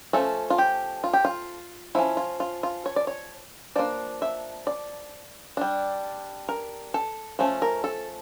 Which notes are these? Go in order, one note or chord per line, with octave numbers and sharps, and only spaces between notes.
F3 A3 C#4 A4
F4
G4
F4
G4
F4
F3 C#4 E4
F4
F4
F4
C#5
D5
C#5
F3 A#3 D4 D5
E5
D5
G3 D4
A#4
A4
F3 A3 C#4 A4
A#4
A4